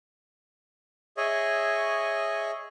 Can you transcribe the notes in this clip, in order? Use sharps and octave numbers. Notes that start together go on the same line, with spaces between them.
G#4 C#5 D#5 E5